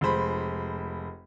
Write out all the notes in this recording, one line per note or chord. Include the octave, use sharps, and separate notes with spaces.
F1 G#3 C5 B5